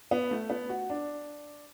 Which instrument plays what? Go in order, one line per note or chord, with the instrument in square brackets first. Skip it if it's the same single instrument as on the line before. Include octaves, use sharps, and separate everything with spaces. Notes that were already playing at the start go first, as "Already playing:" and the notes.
[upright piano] B3
A3
B3
F#4
D4